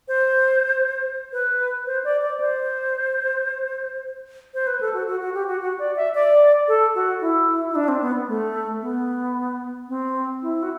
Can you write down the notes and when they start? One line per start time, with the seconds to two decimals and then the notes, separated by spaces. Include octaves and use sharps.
0.08 C5
1.32 B4
1.86 C5
2.04 D5
2.21 D5
2.40 C5
4.54 C5
4.67 B4
4.81 A4
4.94 F#4
5.07 F#4
5.21 F#4
5.34 G4
5.47 F#4
5.61 F#4
5.79 D5
5.96 E5
6.15 D5
6.68 A4
6.95 F#4
7.21 E4
7.71 E4
7.75 D4
7.88 C4
8.01 B3
8.28 A3
8.82 B3
9.89 C4
10.42 E4
10.63 F#4